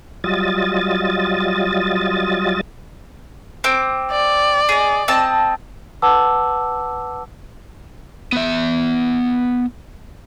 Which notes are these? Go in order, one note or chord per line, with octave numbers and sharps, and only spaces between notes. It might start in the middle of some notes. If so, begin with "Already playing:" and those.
F#3 G3 F4 D#5 A6
C4 D6
D5
G#4 D#5
C4 D#5 A5
B4 F#5 A5 D6 E6
B3 E5